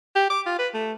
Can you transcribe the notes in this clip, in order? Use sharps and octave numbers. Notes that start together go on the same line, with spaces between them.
G4
D6
F4
B4
A3